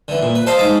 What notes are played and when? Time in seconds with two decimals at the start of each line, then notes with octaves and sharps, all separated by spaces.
0.08 D3 E3
0.22 A#2
0.35 B4
0.47 A4 C5 D#5 F5 A5 B5
0.59 G#2 D#5 D6